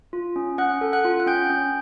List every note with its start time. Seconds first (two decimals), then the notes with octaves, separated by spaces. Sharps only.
0.13 F4
0.36 C#4
0.58 C#4 F#5 F#6
0.81 A4
0.93 F#5 F#6
1.05 F4
1.20 F#6
1.26 C#4 G5 G6
1.50 C#4